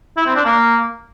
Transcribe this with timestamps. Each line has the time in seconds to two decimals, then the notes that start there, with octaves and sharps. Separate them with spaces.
0.17 E4
0.26 C4
0.36 D4
0.45 A#3